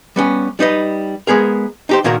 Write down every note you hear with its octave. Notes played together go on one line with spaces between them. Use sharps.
G3 B3 C#4
G3 D#4 B4 D#5
G#3 B3 G#4 A#4
D#4 G4 C5
A#2 D#3 A#3 F#4 A#4